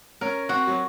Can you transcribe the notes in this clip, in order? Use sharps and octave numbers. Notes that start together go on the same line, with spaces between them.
C#4 A#4
C4 F#4
F#3